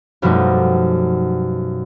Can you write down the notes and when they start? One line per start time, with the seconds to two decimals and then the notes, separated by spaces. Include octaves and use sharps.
0.22 F#2 B2 F3 G3 A3 D#4